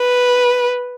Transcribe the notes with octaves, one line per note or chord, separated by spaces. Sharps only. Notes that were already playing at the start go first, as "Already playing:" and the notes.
Already playing: B4